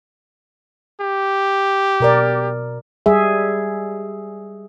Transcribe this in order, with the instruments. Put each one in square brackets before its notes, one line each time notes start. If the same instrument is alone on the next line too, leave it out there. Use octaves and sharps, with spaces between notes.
[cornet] G4
[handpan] B2 A#4 D5
G3 G#4 E5